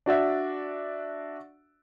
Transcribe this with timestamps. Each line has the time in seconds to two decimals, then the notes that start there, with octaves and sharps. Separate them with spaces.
0.06 D4 F#4 D5 E5